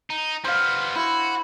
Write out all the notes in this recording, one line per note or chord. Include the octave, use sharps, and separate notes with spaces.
D#4
G3 B3 C5 F5
E4 F#4